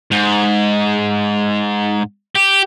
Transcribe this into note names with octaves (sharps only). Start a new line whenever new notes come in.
G#2
G4